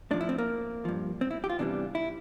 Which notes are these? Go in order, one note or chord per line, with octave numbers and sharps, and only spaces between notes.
A2 F3 D4
E4
C4
A#3
G2 F3
C4
E4
G4
F4
E2 C3 E3 G3 D4
E4